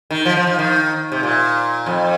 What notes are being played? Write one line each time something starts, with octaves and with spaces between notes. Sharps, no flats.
D#3
F3
F3
F3
D#3
C3
A#2
F2